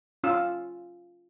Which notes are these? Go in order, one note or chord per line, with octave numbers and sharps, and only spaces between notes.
C#4 F4 E6